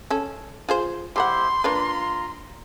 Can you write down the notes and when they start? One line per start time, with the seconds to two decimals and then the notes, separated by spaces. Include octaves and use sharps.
0.10 C#4 A4
0.69 F4 G#4 C5
1.16 G3 E4 G4 A4 C5 F#5 C6
1.64 A#3 D4 F4 B4 A#5